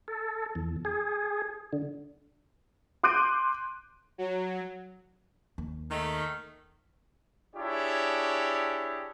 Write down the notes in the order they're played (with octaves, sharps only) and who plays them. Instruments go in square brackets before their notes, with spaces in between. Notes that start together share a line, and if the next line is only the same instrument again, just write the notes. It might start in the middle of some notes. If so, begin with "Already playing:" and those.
[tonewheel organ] A4
E2
G#4
D3
[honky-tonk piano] C6 D6 F#6 G6 D7 D#7
[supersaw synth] F#3
[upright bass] D#2
[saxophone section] D#3 A3
[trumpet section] D4 E4 G4 G#4 C#5